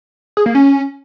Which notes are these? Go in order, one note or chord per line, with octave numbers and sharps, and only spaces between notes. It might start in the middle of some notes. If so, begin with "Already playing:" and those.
G#4
A#3
C#4